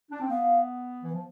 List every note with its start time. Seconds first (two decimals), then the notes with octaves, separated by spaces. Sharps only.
0.11 D4
0.21 C4
0.30 B3 F5
1.03 E3
1.13 F3